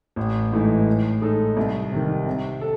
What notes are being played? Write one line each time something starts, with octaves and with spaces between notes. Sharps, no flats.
A1
G#2 E3 A3 D#4
A2
G#3 D#4 A4
C2
C3 D#3
C3
A4